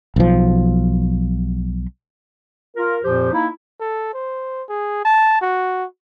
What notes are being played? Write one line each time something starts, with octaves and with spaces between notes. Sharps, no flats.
B1 F3
F4 A#4
F2 A#2 F3 G4 C5
A#3 D#4 E4
A4
C5
G#4
A5
F#4